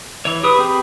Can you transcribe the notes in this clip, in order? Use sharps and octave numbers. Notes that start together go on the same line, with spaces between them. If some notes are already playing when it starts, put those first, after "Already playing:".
E3 C#5
G4 G#4 B4 D#6
C4 G4 G#4 B5